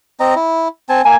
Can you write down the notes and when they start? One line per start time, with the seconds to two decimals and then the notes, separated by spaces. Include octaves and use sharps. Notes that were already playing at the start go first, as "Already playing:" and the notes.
0.20 C4 D#5 A#5
0.36 E4
0.89 C4 G#5 A5
1.05 A#3 G#5